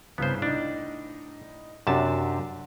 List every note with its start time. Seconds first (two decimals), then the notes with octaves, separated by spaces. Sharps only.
0.18 C2 G2 C#3 B3 C5
0.42 A2 D4 D#4
1.87 F#2 C3 D4 F#4 G4 A5